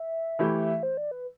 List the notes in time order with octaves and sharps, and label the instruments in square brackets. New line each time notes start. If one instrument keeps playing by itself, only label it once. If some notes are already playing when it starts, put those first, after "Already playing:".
Already playing: [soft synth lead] E5
[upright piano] E3 A3 E4 G4
[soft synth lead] C5
D5
B4